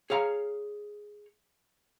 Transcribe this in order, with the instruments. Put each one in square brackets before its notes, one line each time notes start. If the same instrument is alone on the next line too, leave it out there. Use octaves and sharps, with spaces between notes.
[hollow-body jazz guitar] G#4 C#5 F5 A#5